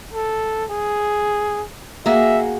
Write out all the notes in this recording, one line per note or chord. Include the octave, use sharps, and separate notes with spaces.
A4
G#4
A#3 F#4 G#4 E5